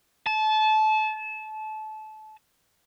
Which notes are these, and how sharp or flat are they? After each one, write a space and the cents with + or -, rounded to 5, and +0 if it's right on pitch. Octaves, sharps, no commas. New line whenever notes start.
A5 -25